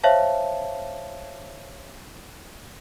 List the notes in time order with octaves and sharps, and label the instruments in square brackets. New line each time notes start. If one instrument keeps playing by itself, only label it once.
[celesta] C5 C#5 E5 F5 A5